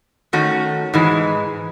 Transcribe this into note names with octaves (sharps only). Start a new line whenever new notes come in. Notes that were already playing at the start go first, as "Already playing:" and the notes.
D#3 A3 C#4 F#4
G#2 E3 G#3